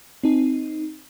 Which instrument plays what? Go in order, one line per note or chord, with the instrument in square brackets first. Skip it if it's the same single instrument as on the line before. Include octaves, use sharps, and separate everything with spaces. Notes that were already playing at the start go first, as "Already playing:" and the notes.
[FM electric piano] C4 D#4